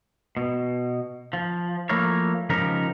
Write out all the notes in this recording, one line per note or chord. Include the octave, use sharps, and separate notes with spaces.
B2
F3
F3 A3 A#3 E4 A#4 C#5
C#3 F3 G#3 D#4 G4 A#4